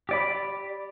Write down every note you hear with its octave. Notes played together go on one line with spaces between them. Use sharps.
G4 D5 B5